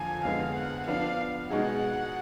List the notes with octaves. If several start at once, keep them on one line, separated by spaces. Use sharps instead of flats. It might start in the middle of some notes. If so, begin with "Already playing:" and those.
Already playing: F2 D3 F3 A#3 G#5
F2 D3 G#3 B3 F5
F#5
F3 B3 D4 F5
B2 G#3 D#4 G#4 F#5